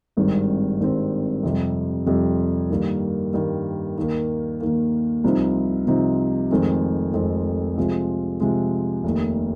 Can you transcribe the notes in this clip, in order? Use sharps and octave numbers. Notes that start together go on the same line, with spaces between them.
G#1 G2 D#3 G3 C4
G#1 G2 D#3 G3 C4
F2 C3 G3
F2 C3 G3
G2 D#3 G3 A#3
G2 D#3 G3 A#3
D#2 D#3 A#3
D#2 D#3 A#3
C2 C3 F3 C4 D#4
C2 C3 F3 C4 D#4
F1 F2 D#3 G#3 C4
F1 F2 D#3 G#3 C4
C3 F3 G#3
C3 F3 G#3
F1 D#2 D#3